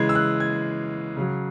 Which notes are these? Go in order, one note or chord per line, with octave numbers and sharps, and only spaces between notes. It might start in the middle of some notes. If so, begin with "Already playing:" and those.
Already playing: C#3 E3 G#3 G#6
E6
F#6
G#6
C#3 F#3